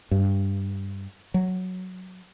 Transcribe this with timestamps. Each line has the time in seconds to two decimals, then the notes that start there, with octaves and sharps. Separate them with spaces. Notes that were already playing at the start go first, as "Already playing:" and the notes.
0.11 G2
1.34 F#3